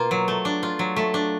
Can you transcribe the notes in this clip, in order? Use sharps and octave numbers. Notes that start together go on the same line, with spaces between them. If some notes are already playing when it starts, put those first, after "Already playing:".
Already playing: B2 A#3 F4
F#3
A3
D4
F4
F#3
A3
D4